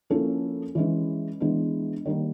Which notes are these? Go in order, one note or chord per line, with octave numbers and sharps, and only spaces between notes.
F3 A#3 C#4 E4 A4
E3 G#3 C#4
E3 G#3 B3 D4
D#3 G3 A#3